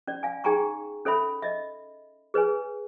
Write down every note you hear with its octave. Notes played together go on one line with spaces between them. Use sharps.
C#4 D5
F5 G#5
D#4 G#4 G5 G#5 A#5 C#6
C#4 A4 C#5 E5 B5
D#5 E5
G#4 B4 C#5 G#5